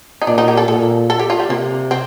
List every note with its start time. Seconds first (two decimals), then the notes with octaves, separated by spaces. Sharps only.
0.22 D#4
0.27 A#2 D4
0.38 D#4
0.48 G4
0.57 A4
0.68 A#2 A4
1.10 A4
1.19 G4
1.30 F4
1.40 G3
1.50 C3 A#3
1.91 C4